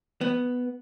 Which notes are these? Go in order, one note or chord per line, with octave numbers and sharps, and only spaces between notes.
B3